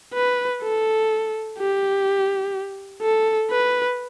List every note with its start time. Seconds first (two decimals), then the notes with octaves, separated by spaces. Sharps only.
0.14 B4
0.63 A4
1.59 G4
3.02 A4
3.51 B4